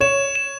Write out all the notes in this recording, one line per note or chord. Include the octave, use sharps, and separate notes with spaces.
C#5 E7
E7